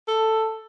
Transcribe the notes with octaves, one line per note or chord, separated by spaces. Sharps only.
A4